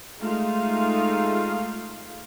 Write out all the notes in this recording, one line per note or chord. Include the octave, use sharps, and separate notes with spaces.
G#3 A3 D#4 F4 F5